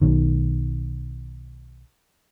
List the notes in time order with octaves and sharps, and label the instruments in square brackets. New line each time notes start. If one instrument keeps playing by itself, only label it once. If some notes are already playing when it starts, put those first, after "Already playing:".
[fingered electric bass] B1 B2 D#3